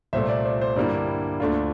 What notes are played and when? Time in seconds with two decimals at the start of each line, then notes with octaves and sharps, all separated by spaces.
0.13 C2 A#2 A3 C5 E5
0.29 D5
0.45 C5
0.61 C5
0.76 G2 D3 G3 A#3 E4 D5
1.40 D2 D3 A3 D4 F4